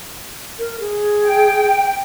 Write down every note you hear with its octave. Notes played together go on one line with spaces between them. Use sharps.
A#4
G#4
G5